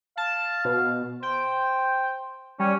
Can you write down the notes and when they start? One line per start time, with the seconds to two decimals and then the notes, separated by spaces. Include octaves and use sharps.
0.17 F5 A5
0.65 B2
1.23 C5 G5
2.59 G3 C#4